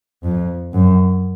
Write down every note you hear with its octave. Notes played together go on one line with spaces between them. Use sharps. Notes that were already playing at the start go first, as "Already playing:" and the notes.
F2
F#2